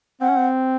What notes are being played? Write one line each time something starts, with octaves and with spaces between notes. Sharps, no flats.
C4 F#5
C#4
C4